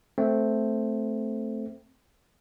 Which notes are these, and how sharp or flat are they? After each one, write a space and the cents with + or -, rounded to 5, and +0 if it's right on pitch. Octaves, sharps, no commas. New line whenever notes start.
A3 +0 C4 +0